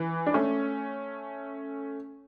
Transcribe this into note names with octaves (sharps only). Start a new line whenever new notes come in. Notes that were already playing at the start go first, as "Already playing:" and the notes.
Already playing: E3
D4
A3 C#4